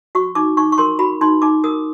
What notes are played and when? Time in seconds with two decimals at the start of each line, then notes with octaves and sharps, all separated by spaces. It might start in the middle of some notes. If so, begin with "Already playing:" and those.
0.15 F#4 C#6
0.35 D#4 D6
0.57 D#4 C#6
0.72 C#6
0.78 A#4 C6
0.99 F#4 B5
1.21 D#4 C6
1.42 D#4 D6
1.64 A#4 D#6